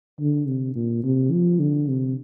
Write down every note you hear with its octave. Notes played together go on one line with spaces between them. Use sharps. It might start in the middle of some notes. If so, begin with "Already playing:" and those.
D3
C3
A#2
C3
F3
D3
C3